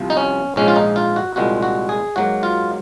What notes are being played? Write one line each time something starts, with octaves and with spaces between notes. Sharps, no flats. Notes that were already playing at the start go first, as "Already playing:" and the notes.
Already playing: C2 C3 F3
D#4
C#4
A#1 G#2 F3 G#3 C#4
F4
D#4
F4
F#4
C2 A#2 F3 G#3 C4 F#4
F#4
G#4
G#2 F#3 A#3 F#4
F4